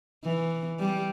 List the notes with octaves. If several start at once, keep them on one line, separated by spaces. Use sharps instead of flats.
E3
G3